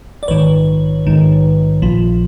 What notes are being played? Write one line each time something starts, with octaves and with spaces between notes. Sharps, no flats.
D5
A#1 G#2 D#3 B4 C#5
A#1 G#2 D#3
A#1 A#2 F3